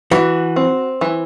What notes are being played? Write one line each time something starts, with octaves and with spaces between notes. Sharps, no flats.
E3 F#4
C4
E3